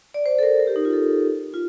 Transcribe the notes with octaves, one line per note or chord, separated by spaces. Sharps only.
D5
C5
A4
A#4
A#4
G4
D#4
F4
A4
F4